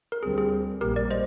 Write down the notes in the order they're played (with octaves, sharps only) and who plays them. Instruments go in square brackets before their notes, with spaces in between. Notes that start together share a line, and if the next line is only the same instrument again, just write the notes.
[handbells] A#4
[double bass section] D2 D3 G3 C4 [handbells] G#4
[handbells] G#4
[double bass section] A#1 G#2 G3 A#3 [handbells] G4 A#4
[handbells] A#4 D5
C5 D#5